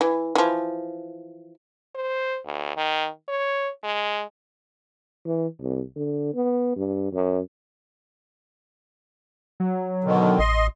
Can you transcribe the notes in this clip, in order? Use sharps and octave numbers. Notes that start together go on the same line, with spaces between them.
E3
E3 F3
C5
D2
D#3
C#5
G#3
E3
C2
D3
B3
G2
F#2
F#3
B2 D3 D#3
A1 D#5 C6